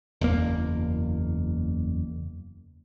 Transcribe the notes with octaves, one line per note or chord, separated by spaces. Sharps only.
F#1 E2 A#3